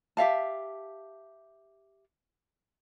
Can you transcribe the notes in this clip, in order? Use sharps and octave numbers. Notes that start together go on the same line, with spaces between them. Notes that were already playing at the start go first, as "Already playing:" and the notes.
G4 E5 F5 A5